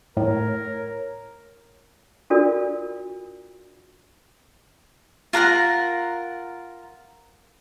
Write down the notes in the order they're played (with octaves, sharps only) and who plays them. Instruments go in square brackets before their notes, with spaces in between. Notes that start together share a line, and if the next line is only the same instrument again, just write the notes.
[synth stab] A2 [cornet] A#4 [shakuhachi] C#5
[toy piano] D4 F4 F#4 A4 A#4 D5
[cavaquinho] F4 A#4 F#5 A#5